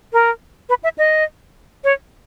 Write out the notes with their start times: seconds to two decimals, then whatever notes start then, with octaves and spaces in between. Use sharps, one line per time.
0.13 A#4
0.69 B4
0.83 E5
0.98 D#5
1.84 C#5